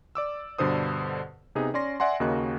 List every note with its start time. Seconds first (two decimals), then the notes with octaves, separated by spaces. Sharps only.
0.15 D5 D6 E6
0.58 G2 B2 D3 A4 C5 D#6
1.55 C3 B3 D#4 G#4 B4
1.74 C#4 D5 C6 A#6
2.00 D5 E5 F#5 G#5 C6
2.20 D#2 C#3 A#3 F#4 D#5 F#6